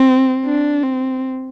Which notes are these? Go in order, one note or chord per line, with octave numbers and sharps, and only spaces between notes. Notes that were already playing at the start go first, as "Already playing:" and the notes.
Already playing: C4
D4
C4